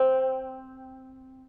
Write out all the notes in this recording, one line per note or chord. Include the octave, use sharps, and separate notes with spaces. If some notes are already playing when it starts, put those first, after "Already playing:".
Already playing: C4